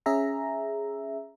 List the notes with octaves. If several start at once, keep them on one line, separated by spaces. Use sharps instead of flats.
C#4 G#4 E5 A#5